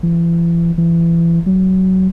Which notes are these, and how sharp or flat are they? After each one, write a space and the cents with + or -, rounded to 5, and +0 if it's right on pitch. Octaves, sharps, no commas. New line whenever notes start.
E3 +40
E3 +30
F#3 +20